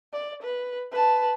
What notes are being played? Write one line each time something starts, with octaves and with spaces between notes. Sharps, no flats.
D5
B4
B4 A5